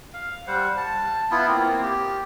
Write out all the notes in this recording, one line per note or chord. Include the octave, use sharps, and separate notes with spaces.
F5
G3 C5 F#5
A5
B3 E4 F4
A#3 C4
G4